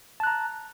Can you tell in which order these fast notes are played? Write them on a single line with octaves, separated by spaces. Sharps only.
A5 F#6 A#5